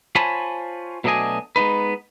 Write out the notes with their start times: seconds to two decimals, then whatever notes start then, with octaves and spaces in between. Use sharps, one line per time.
0.15 F4 C5 C#5 G#5 A5 B5
1.04 B2 F#3 A3 D4 D#5 G#5
1.56 G#3 B3 D#4 B4